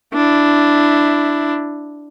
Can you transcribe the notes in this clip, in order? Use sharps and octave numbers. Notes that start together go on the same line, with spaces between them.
D4 E4